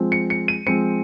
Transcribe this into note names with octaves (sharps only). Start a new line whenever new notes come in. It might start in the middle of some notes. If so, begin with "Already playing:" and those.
Already playing: F3 G#3 C4
C#7
C#7
D#7
F3 G#3 C4 C#7